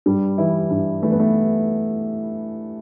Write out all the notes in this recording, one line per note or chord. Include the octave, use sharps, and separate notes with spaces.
G2 G3
E3 E4
G2
E3 A3
B3
A3